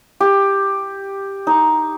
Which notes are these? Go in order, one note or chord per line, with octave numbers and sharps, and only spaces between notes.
G4
D#4